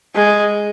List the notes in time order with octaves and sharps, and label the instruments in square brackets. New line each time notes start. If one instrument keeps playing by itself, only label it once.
[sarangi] G#3